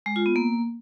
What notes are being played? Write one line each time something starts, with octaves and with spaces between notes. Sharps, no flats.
G#3
F4
B3
A#3